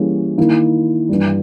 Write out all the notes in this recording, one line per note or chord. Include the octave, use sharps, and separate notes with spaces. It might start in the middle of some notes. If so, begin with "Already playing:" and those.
Already playing: E3 G3 A#3 C#4 G#4
D#3 A#3 E4
G2 E3 G3